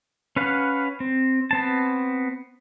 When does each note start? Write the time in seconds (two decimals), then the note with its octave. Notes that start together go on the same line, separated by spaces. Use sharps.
0.36 C#4 B4 F5 F#5
1.00 C4
1.51 B3 C4 A5